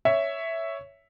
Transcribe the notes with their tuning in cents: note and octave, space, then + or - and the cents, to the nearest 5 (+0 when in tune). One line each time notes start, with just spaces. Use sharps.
C#5 +5 E5 +0